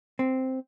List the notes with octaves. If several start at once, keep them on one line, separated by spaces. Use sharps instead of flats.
C4